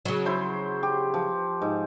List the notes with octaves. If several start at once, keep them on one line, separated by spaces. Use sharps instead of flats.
C#3 F#3
E4 C5 C6
G4
F3
G#2